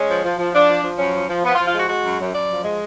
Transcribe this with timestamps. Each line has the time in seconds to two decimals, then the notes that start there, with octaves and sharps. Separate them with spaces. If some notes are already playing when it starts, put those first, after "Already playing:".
Already playing: G#3 C#4
0.10 F3
0.24 F3
0.38 F3
0.54 F3 D4
0.69 F3
0.84 F3
0.98 F#2 C#4
1.15 F3
1.29 F3
1.44 F3 B3
1.55 F4
1.59 F3
1.67 F4
1.74 G#3 F#4
1.89 G#3 F#4
2.05 F#2
2.20 F#2
2.34 F#2 D5
2.50 F3
2.64 G#3